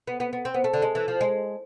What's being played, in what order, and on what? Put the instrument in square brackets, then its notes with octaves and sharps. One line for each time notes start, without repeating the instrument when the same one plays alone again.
[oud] B3
B3
B3
C4
B3
A3
D3
G#3
E3
F3
G#3